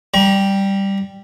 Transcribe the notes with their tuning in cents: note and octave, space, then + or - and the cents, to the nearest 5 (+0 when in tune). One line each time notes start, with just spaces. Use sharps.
G3 +0 A#5 +40